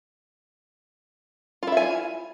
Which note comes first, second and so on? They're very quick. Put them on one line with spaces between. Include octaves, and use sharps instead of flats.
F4 E4 E5 G#5